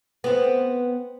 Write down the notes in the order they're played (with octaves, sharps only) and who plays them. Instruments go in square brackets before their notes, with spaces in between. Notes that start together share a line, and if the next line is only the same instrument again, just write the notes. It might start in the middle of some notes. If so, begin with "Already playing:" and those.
[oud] B3 C4